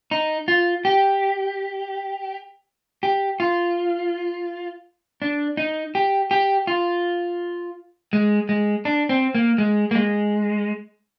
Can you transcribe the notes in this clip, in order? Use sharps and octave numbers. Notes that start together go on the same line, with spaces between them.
D#4
F4
G4
G4
F4
D4
D#4
G4
G4
F4
G#3
G#3
D4
C4
A#3
G#3
A#3
G#3